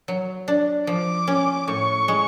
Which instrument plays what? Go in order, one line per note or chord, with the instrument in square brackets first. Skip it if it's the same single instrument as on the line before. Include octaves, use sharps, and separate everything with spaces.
[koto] F#3
D4
[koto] F3 [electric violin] D6
[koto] C#4
[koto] A2 [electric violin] C#6
[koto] G#3